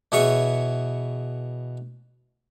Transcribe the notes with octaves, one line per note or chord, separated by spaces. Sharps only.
B2 E3 G#4 C#5 E5 C#6